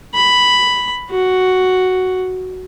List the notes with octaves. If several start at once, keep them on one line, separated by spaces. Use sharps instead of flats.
B5
F#4